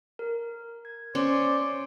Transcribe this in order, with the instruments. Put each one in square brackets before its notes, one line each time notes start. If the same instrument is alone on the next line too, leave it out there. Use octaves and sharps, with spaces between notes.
[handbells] A#4
G#6
[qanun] C#4 [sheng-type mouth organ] C5 D5